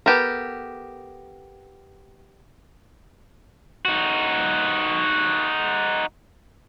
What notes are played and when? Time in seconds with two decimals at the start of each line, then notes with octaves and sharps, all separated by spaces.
0.06 B3 G4 A4 A#4
3.85 D#4 F#4